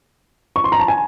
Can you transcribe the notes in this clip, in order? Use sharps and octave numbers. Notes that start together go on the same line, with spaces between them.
C#6
C6
A#5
A5
G#5